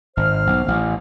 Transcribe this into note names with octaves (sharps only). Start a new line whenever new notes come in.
G#1 C5 F6
B1
A1